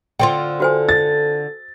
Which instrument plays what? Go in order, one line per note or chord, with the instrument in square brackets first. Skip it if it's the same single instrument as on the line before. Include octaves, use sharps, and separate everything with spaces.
[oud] D3 C4 F4 [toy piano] G5
[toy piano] F#4 C5 G#5 [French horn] A4
[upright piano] A6